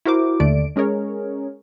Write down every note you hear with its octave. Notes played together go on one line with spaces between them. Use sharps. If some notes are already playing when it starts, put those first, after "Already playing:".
E4 F#4 A#4 C5 D6
D#2 D3 A3 D5 D7
G#3 C#4 G#4 A#4 C#5